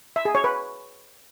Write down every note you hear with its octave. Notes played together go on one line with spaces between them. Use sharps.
E5
G#4
C#5
B4